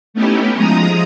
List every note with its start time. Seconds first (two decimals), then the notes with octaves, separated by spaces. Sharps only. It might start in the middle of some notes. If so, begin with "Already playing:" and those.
0.14 A3 B3 C#4 D#4 E4 G4
0.54 F3 G#3 A#5 D#6